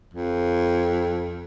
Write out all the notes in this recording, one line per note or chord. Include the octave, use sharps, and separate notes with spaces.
F2